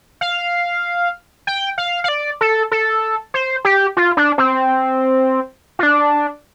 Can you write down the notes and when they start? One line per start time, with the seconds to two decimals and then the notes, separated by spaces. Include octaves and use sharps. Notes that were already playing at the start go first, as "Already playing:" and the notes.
0.21 F5
1.47 G5
1.78 F5
2.04 F5
2.08 D5
2.41 A4
2.72 A4
3.34 C5
3.65 G4
3.97 F4
4.17 D4
4.38 C4
5.79 F4
5.83 D4